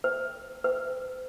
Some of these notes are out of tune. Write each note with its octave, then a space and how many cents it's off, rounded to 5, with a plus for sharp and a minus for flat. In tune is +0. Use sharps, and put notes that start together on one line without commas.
C5 -15
C5 -35